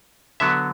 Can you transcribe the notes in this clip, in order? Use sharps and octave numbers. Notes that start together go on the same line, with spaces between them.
D3 F#3 B3 E5